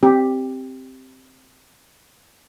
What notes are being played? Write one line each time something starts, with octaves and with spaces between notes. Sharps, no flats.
C4 G4